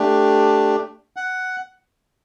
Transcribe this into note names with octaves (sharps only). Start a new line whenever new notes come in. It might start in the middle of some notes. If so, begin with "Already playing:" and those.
Already playing: A3 D4 G4
F#5